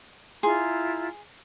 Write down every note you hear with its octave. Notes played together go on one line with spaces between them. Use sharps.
E4 F4 G#4 A#5 C6